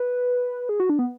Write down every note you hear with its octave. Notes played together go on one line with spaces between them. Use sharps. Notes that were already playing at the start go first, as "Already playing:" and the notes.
Already playing: B4
G#4
F#4
D4
B3